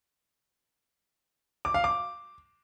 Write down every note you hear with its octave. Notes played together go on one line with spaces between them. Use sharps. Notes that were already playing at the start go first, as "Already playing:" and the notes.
D6
F5
D6